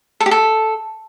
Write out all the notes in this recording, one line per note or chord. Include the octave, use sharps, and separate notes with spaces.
A4
G4
A4